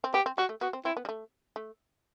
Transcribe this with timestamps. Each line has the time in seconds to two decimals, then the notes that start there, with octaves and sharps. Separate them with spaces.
0.04 C4
0.14 B3 G4
0.26 C4
0.38 G3 F#4
0.49 A3
0.61 B3 F#4
0.73 C4
0.85 C4 E4
0.97 B3
1.05 G3
1.09 A3
1.56 A3